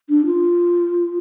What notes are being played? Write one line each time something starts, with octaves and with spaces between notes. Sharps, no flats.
D4
F4